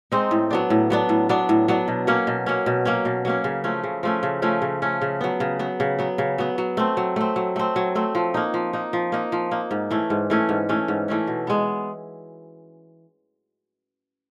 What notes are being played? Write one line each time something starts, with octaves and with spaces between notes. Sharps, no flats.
G#3 C4 D#4
A2
F#3 B3 D4
A2
F#3 B3 D4
A2
F#3 B3 D4
A2
F#3 B3 D4
B2
F#3 A#3 C#4
B2
F#3 A#3 C#4
B2
F#3 A#3 C#4
B2
F#3 A#3 C#4
C#3
F3 A3 C#4
C#3
F3 A3 C#4
C#3
F3 A3 C#4
C#3
F3 A3 C#4
C#3
F#3 B3
C#3
F#3 B3
C#3
F#3 B3
C#3
F#3 B3
F#3
A3 C4
F#3
A3 C4
F#3
A3 C4
F#3
A3 C4
F3
A#3 D#4
F3
A#3 D#4
F3
A#3 D#4
F3
A#3 D#4
G#2
E3 A3 C#4
G#2
E3 A3 C#4
G#2
E3 A3 C#4
G#2
E3 A3 C#4
B2
G#3 B3